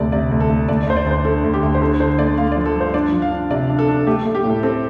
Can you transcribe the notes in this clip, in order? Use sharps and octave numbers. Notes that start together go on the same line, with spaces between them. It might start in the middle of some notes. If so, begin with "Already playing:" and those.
Already playing: D2 C3 A3 D5
C3 D5
D2
A4
A3
D2 D5
D5
D2 C5
D5
D2 C5
D3 A4
D2
G4
D2
C5
D3 A4
D3 C5
A3 D5
A3 F5
D5
F3
A4
G2 C5
D4 D5
F3
F5
D4
C3 D5
D4
A4
D4
A3 G4
A4
A3
G4
A2 A4
C4 A4